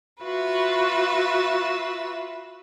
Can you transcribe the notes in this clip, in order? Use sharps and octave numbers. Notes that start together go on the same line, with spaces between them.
F4 F#4 B4 E5